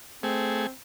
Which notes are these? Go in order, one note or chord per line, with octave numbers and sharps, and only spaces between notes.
A3 C4 G#4